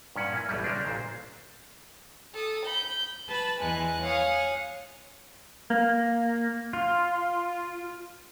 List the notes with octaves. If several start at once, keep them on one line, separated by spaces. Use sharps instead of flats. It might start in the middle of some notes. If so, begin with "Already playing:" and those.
G2 A#2 C#4 F#5
A#3 E4 G#5
A1 E2 B2 F#3 G3
C#3 G3 G#3 D4
A1 A#2 C5
A4 D#6
B5 G6
B4 A5 B5
E2 E3 G#3 B4 G#5 F#6
C#5 F5 F#5 G#5 D#6
A#3
F4